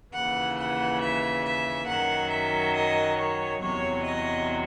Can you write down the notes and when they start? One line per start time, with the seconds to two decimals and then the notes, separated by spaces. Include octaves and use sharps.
0.14 D#2 C#3 E3 F#5
0.57 F#5
1.01 E5
1.44 E5
1.87 F#2 D#3 F#3 F#5
2.31 E5
2.74 D#5
3.18 C#5
3.61 E2 C3 F#3 C#5
4.04 D#5